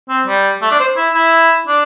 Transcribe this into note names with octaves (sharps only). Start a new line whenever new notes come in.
C4
G3
A3
D4
C5
E4
E4
D4